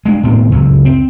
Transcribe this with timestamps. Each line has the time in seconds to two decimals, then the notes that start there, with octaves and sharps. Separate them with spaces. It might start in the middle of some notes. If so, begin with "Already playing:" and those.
0.06 G#3 D4
0.23 A2 D#3 B3 C4
0.51 C#2 F#2 C#3
0.85 C4